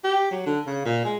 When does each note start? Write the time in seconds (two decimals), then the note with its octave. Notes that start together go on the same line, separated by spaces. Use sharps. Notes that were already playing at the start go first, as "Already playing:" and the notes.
0.04 G4
0.31 F#3
0.46 D3
0.67 C#3
0.85 A#2
1.05 G#3